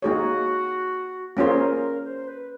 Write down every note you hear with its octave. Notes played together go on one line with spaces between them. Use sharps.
A#3 D#4 F#4 G#4 C#5
A#3 C#4 F4 G#4 A#4 C5
C5
B4